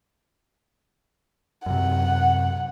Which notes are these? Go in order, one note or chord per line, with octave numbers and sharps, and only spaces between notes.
F#2 C3 F#5